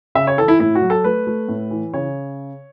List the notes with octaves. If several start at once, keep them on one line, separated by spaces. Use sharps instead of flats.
C#3 E5
C#5
E3 A4
E4
A2 E4
F#4
F#3
A4
A3 B4
A3
A2
E3
C#3 C#5